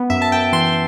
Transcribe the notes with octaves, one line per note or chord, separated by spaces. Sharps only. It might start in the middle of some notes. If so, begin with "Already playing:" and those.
Already playing: B3
F#2 E5
A5
F#2 G5
E3 C6